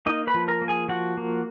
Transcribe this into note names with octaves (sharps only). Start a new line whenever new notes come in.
A#3 D#4 D#5
B4 B5
F3
A#4 A#5
A#3
G#4 G#5
F3 F#4 F#5
A#3